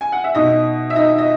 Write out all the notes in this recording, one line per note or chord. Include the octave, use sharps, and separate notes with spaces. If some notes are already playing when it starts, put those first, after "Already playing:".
G#5
F#5
E5
B2 D#4 D#5
E5
D#4 D#5
D#5